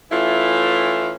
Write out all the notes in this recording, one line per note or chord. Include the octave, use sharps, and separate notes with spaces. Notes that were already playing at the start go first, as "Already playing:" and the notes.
E3 A3 C#4 E4 F4